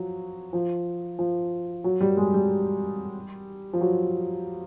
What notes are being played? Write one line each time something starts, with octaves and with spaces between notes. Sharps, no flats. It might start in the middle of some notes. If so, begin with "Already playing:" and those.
Already playing: F3 F#3
F3
F3
F#3
G3
G#3
G3
F3
F#3